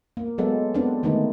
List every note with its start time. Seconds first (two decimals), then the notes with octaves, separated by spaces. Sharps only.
0.17 A#3
0.38 F#3 G#3 B3 A4
0.74 B3 C4 D4
1.03 D3 D#3 G#3 A3 B3 D#4